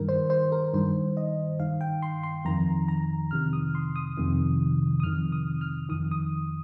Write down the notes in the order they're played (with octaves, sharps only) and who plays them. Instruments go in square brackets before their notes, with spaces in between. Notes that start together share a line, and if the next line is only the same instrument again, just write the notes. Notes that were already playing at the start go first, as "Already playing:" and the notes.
Already playing: [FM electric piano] G2 D#3 A#4
C5
C5
A#4
G2 D#3 C5
D#5
G2 D#3 F5
G5
C6
C6
F2 D#3 A#5
A#5
F2 C3 D#3 F6
D#6
C6
D#6
F2 C3 D#3
D#6
F2 C3 D#3 F6
D#6
F6
F2 D#3 D#6
D#6